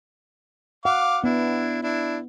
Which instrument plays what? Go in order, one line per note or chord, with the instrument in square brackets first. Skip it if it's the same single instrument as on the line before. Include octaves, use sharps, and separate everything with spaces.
[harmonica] F5 D6 [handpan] F#5
[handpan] B3 [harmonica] D4 E4
[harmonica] D4 E4